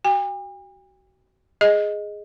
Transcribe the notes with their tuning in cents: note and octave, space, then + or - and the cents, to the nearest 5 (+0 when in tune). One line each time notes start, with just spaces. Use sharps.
F#4 +25 G5 +45
G#4 +0 D#5 +0